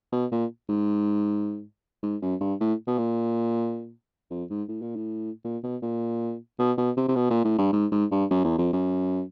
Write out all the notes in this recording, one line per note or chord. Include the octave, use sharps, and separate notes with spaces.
B2
A#2
G#2
G#2
F#2
G2
A2
B2
A#2
F2
G#2
A2
A#2
A2
A#2
B2
A#2
B2
B2
C3
C3
B2
A#2
A2
G2
G#2
G#2
G2
F#2
E2
F2
F#2